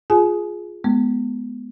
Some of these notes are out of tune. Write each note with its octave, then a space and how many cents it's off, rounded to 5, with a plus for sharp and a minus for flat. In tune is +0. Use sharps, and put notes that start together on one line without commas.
F4 +10 G#4 +0 G#5 +35
G#3 +25 B3 +0